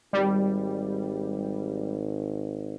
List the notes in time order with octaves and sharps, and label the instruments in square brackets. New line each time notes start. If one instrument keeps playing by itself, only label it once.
[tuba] G#1 [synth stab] G3